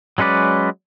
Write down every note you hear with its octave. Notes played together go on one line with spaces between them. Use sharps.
F#3 G#3 C#4 B4 D5